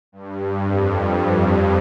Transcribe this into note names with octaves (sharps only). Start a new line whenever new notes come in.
G2
F2